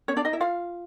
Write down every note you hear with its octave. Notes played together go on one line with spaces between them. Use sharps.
C#4 C#5
D4 D5
D#4 D#5
E4 E5
F4 F5